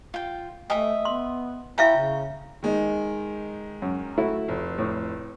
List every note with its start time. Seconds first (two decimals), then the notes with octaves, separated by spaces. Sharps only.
0.14 F4 G5
0.70 A3 D#5 E5 G5 G#5
1.05 B3 C6
1.78 E4 C#5 E5 F5 G5 G#5 A#5
1.97 C#3
2.63 D#3 G#3 D#4
3.82 F#2
4.18 A3 E4 F#4
4.48 F1
4.78 A2